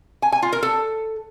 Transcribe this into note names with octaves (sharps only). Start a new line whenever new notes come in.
G#5
G#5
F4
A#4
A4